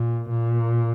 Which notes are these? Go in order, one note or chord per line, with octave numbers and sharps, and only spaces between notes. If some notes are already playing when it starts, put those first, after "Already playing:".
Already playing: A#2
A#2